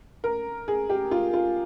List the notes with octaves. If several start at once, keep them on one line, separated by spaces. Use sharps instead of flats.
A#4
G#4
G4
F4
F4